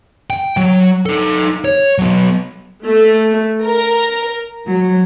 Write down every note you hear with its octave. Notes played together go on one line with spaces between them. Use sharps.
G5
F#3
D#4 A4
C#5
F#3 B3
A3
A#4
F#3